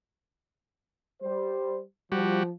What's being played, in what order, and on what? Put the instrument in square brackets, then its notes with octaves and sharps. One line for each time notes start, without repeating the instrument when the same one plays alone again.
[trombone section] G3 C5
[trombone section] F3 [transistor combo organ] G3 F#4